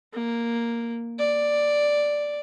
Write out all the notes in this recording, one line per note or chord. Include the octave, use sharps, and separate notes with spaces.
A#3
D5